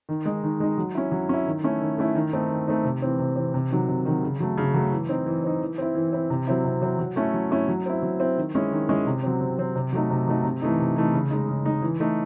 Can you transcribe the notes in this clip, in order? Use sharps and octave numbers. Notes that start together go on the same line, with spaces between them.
D#3
G#3 D#4
D#3
G#3 D#4
F#3
C#4 E4
F#3
C#4 E4
D#3
A3 C#4 E4
D#3
A3 C#4 E4
D#3
A3 C4 D#4
D#3
A3 C4 D#4
C3
E3 C4
C3
E3 C4
C3
D#3 F#3
C3
D#3 F#3
C#3
F#3 A3
C#3
F#3 A3
E3
C4 D#4
E3
C4 D#4
E3
C4 E4
E3
C4 E4
C3
F#3 C4 E4
C3
F#3 C4 E4
F#3
A3 C#4 E4
F#3
A3 C#4 E4
F#3
C4 E4
F#3
C4 E4
D#3
G#3 C#4 E4
D#3
G#3 C#4 E4
C3
F#3 C4
C3
F#3 C4
C3
F#3 A3 D#4
C3
F#3 A3 D#4
C3
E3 A3 D#4
C3
E3 A3 D#4
C#3
G#3 D#4
C#3
G#3 D#4
E3
A3 D#4